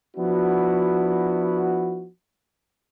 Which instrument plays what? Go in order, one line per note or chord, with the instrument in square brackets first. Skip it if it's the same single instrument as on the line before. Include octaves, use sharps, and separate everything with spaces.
[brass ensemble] F3 B3 D4 E4 F#4